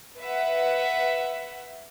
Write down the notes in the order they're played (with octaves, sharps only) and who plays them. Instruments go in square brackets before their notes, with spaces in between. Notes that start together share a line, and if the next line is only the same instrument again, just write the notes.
[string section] B4 E5 F#5